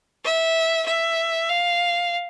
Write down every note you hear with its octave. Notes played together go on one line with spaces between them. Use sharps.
E5
E5
F5